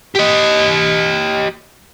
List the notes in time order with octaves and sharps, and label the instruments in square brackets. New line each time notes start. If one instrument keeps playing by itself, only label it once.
[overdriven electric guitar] G4 D#5